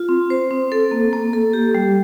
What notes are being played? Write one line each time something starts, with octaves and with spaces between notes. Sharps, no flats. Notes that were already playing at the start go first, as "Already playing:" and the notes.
Already playing: F4
C4
C5
C4
A4
A#3
A#3
A4
G4
G3